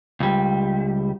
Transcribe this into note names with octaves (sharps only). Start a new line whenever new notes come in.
C#2 G3